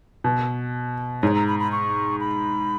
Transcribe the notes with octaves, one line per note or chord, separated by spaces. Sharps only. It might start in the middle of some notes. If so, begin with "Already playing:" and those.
B2
G#2 C#5
A#5
B5
B5
C#6
B5